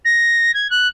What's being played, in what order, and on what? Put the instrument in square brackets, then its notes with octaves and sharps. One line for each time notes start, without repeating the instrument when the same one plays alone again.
[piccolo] A#6
G#6
F#6